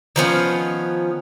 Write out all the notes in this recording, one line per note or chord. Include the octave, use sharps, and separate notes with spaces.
D#3 F3 B3 C#4